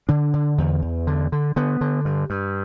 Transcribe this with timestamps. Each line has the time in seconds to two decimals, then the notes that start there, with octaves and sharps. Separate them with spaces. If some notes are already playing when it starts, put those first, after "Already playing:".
0.09 D3 D4
0.34 D3
0.58 E2
0.82 E2
1.07 D3
1.32 D3
1.56 D3 B3
1.81 D3
2.05 G2
2.30 G2